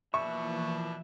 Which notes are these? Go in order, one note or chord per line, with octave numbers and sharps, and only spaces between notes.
B2 E3 F3 A#3 D4 E5 C#6